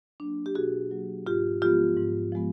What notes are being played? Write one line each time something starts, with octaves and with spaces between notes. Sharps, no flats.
F#3 A#3 D4
G4
B2 F#4 G#4
F#3 A#3
G#2 F4 G4
F3 G#3 B3 F4 G4
G#2
F3 G#3 B3